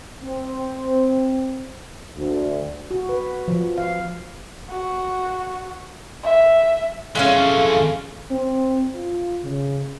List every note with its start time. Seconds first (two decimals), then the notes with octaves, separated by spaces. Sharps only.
0.24 C4
2.17 D2
2.91 F#4
3.09 B4
3.48 F3
3.78 F5
4.70 F#4
6.23 E5
7.15 F2 E3 G#3 A3 C#4 F5
8.31 C4
8.95 F4
9.44 C#3